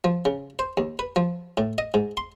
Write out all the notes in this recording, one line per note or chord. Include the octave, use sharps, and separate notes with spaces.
F3
C#3
C5
D#2
B4
F3
A2
D#5
G#2
C6